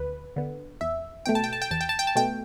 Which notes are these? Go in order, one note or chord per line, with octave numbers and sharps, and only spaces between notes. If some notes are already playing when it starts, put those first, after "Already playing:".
Already playing: D2 B4
D3 B3
E2 E5
B2 A3 G5
A5
G5
A5
G5
E2 A5
G5
A5
G5
A5
B2 A3 G5